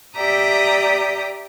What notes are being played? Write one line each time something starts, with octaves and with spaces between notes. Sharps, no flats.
G4 D5 E5 G5 A#5 D#6